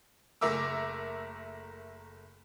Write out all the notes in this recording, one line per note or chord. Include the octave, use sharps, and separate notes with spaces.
F#1 A3 A#4 E5 D6 E6